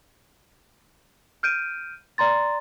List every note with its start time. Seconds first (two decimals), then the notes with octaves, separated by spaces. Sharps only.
1.43 F6 G6 D7 D#7
2.18 D5 A#5 C6 A6